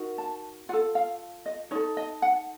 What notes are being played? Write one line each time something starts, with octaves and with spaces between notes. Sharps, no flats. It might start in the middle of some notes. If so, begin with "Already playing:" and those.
Already playing: D#4 F#4 A#4
A5
F4 A4 F#5
F5
D#5
D#4 A4 C#5
D#5
F#5